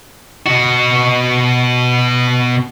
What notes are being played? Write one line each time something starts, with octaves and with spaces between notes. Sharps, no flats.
B2 F#4